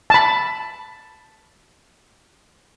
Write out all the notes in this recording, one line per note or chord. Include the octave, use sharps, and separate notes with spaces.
A5 B5